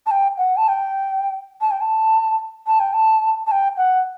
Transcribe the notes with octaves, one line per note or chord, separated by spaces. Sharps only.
A5
G5
F#5
A5
G5
A5
G5
A5
A5
G5
A5
A5
G5
F#5